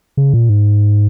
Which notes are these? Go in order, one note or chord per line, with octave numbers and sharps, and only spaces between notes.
C#3
A#2
G#2